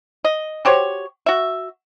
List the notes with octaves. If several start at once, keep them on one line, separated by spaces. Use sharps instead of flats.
D#5
F#4 G4 C5 C#5
F#4 E5